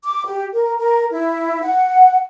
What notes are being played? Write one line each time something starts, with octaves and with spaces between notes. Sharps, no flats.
D6
G4
A#4
A#4
E4
F#5